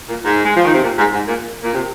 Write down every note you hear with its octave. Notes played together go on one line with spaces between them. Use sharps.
A#2
G#2
G#3
F3
D#3
C3
A#2
G#2
G#2
A#2
A#2
C3